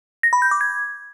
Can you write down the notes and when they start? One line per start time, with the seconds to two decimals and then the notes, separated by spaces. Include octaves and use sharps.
0.23 A#6
0.33 B5
0.42 G6
0.51 D6
0.61 G#6